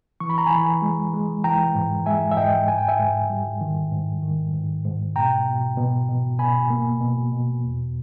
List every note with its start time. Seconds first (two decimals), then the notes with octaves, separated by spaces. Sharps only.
0.20 E3 C#6
0.29 B5
0.38 A#5
0.46 E3 G#5 B5
0.82 G#3
1.13 G#3
1.44 E3 G5 A#5
1.75 G#2
2.06 G#3 E5 G#5
2.31 E5
2.37 G#2 D#5 G5
2.68 G#2 G#5
2.78 G5
2.88 E5 G#5
2.99 G#2
3.30 G3
3.61 D#3
3.92 G#2
4.23 D#3
4.54 G#2
4.85 G#2
5.16 B2 G5 A#5
5.47 B2
5.77 B2
6.09 B2
6.39 B2 G#5 B5
6.70 A#3
7.01 B2
7.32 B2
7.63 E2